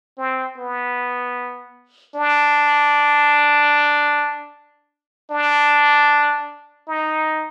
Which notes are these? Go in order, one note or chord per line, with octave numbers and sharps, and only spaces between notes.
C4
B3
D4
D4
D#4